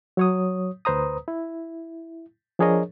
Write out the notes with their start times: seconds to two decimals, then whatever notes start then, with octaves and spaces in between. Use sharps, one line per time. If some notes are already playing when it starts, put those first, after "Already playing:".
0.17 F#3 C#5 D#6
0.85 D2 B4 C5 A#5 D#6
1.28 E4
2.59 F3 D4 G#4 A#4 C#5 D#5